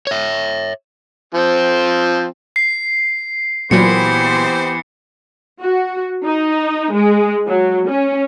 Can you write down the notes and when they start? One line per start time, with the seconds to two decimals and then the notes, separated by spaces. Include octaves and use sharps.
0.07 C#5 E5
1.34 F3 C4
2.56 C7
3.71 A#2 E3 F#3 B3 C4 G4 C5 C#7
5.61 F#4
6.24 D#4
6.94 G#3
7.47 F#3
7.88 C#4